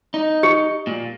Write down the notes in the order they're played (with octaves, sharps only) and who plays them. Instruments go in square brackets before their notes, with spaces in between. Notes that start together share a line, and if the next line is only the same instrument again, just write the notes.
[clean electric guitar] D#4
[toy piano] G4
[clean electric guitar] A#2